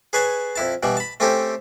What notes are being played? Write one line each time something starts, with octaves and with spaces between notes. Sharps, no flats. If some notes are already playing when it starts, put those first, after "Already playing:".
G#4 B4 C#5 G#5 A5
F2 E4 A5
B2 E3 G3
A5 B5
A3 C4 C#4 G4 A4